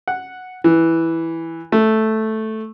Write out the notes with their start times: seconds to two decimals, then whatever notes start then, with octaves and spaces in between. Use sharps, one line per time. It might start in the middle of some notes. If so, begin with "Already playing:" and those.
0.08 F#5
0.64 E3
1.72 A3